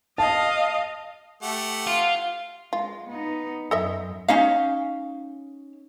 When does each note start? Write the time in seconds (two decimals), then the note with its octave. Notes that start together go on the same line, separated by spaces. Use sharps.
0.18 D#5 F5 A5
1.43 A3 G4 F#5
1.87 F4
2.73 G#3 F4
3.08 B3 D#4
3.71 F#2 A4 D#5 E5
4.28 C#4 D#4 F5